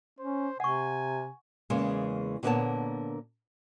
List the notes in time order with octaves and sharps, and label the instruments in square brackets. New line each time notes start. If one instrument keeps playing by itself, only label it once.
[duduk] C#4 [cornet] C5
[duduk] C3 [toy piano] F#5 C#6 [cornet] G#5
[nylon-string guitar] E2 C#3 E3 G#3 A#3
A#2 D3 A#3 B3 C#5 A5